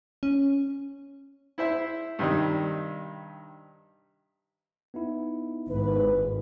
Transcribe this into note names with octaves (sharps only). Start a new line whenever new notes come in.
C#4
E4 C5 E5
G2 C3 D#3 G3 D#4
B3 D#4 E4
G#1 B4